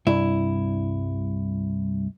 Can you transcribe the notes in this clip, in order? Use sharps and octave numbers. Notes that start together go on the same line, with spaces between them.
C2 G2 E4